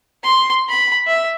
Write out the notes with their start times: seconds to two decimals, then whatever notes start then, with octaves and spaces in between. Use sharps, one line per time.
0.24 C6
0.70 B5
1.07 E5